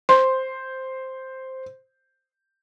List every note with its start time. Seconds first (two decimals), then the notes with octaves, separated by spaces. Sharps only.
0.09 C5 C6